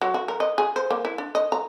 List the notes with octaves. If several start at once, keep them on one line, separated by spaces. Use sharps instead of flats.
F#3
F#4
A#4
D#5
G#4
C5
A#3
E4
D4
D#5
A#5